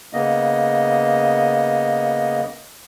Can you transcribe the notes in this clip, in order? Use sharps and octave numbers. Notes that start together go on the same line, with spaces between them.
C#3 A#3 B3 D#5